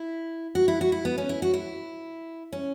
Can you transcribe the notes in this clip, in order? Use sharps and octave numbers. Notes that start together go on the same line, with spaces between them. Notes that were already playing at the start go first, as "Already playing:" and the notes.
Already playing: E4
F#4
E4
F#4
E4
B3
C#4
E4
F#4
E4
C#4